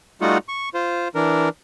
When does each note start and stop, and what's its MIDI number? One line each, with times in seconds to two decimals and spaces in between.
0.21 0.38 55
0.21 0.38 57
0.21 0.38 63
0.21 0.38 65
0.21 0.38 66
0.21 0.38 78
0.48 0.69 85
0.74 1.08 65
0.74 1.08 72
1.15 1.49 52
1.15 1.49 62
1.15 1.49 70